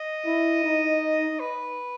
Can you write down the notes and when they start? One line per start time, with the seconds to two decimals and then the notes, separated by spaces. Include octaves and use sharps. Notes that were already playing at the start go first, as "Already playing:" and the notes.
Already playing: D#5
0.26 E4
0.64 D#4
1.40 B4